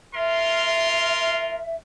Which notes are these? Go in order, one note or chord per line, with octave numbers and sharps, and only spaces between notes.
F4 A#4 E5 C6